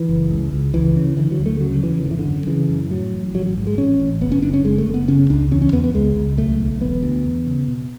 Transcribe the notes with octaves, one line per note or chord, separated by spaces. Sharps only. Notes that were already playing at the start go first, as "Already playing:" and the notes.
Already playing: E3
F#1
C#2
C#2
C#2 E3
C#3
D3 E3
F#3
D2
A3
C#3 F#3
E2 E3
G#1 D3
E3
D3
F#2
C#3 E3
F#2
A2 F#3
A1
A1 F#3
F#3
G#2
G#3
A1 C#4
A1
F#1 B3
C#4
F#1 D4
C#4
F#1 G#3
A3
F#1
B3
C#3 C#4
C#2 D4
E2 C#4
C#4
E2 B3
B3
C#2 G#3
C#2
B1 A3
B1
E1 B3
D2
E2
C#3
B2